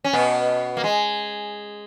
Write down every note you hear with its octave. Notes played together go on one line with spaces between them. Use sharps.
C#4
B2 B3
A#3
G#3